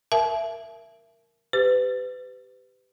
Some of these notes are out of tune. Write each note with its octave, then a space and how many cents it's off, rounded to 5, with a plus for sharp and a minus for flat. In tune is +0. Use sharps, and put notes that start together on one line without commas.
A#4 +0 E5 +20 A5 -45
G4 +0 B4 +35